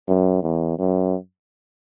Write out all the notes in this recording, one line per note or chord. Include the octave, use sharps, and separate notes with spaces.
F#2
E2
F#2